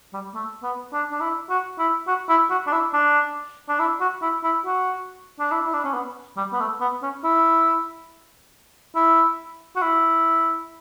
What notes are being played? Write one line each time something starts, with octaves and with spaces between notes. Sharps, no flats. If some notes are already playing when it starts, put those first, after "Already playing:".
G3
A3
B3
D4
D4
E4
F#4
E4
F#4
E4
F#4
D4
E4
D4
D4
E4
F#4
E4
E4
F#4
D4
E4
E4
D4
C#4
B3
G3
B3
A3
B3
C#4
E4
E4
F#4
E4